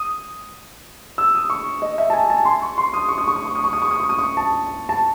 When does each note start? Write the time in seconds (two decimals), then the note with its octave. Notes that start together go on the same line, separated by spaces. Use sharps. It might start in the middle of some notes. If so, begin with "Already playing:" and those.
Already playing: D#6
1.18 E6
1.35 D#6
1.50 C#6
1.82 D#5
1.98 E5
2.10 A5
2.13 G#5
2.30 A5
2.45 C6
2.62 C#6
2.78 C6
2.93 D#6
3.09 C#6
3.18 D#6
3.28 C#6
3.36 D#6
3.46 C#6
3.55 D#6
3.64 C#6
3.73 D#6
3.82 C#6
3.91 D#6
4.00 C#6
4.09 D#6
4.19 C#6
4.37 A5
4.89 A5